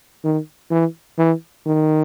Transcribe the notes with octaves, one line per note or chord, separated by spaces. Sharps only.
D#3
E3
E3
D#3